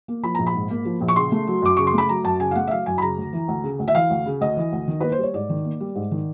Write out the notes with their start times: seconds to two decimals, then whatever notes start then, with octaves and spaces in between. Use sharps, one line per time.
0.08 A#3
0.23 F3 B5
0.35 A#1 A#5
0.47 B5
0.54 G#2
0.70 A#3
0.85 F3
1.01 A#1
1.08 C#6
1.16 C#3 C6
1.32 A3
1.47 F#3
1.62 F#2 D6
1.77 C#3 C#6
1.87 C6
1.93 A3 B5
2.09 F#3 A#5
2.24 F#2 A5
2.40 C#3 G#5
2.51 F5
2.55 A3 F#5
2.67 E5
2.71 F#3 F5
2.86 F#2 G#5
2.98 B5
3.02 C#3 A#5
3.17 D2
3.33 E3
3.48 D2
3.64 C#3
3.79 D2
3.88 E5
3.95 E3 F5
4.10 D2
4.26 C#3
4.41 D2 D#5
4.57 E3
4.72 D2
4.88 D#3
5.01 A#3 B4
5.12 C5
5.18 G3 C#5
5.34 G#2 D5
5.49 D#3
5.65 A#3
5.80 G3
5.95 G#2
6.11 D#3